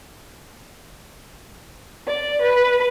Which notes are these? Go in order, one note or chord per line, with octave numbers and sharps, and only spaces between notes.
D5
B4